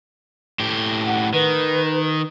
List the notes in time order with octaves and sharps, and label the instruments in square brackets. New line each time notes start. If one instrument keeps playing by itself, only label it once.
[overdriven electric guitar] A2 G4
[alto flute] F#5
[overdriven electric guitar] D#3 [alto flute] B4